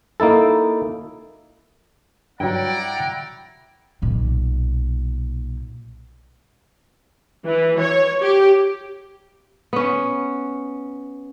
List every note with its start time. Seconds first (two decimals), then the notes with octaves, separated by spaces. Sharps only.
0.20 A#3 D#4 E4 A4
2.40 G2 F#3 E4 D5 F#5 G5 A#5
4.02 B1 A#2
7.46 E3
7.79 C#5
8.22 G4
9.73 B3 C#4